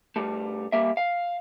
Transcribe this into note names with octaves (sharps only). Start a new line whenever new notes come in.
G2 G3 A3
G3 A#3 E5
F5